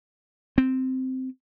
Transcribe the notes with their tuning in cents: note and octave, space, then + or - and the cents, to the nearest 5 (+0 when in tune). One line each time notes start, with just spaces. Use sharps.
C4 -10